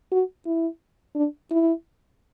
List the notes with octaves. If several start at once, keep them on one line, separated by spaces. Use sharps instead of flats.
F#4
E4
D4
E4